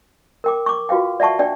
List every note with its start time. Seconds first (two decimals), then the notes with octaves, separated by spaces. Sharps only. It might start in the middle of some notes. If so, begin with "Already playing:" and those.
0.44 A#4 G5 D6
0.66 C#6 D6
0.89 F4 F#4 B4 F5 G5
1.20 D5 E5 F#5 A5 C#6
1.39 D4 D5 G5